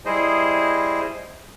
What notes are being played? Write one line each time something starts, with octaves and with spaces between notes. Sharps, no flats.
G3 E4 G#4 C5 D#5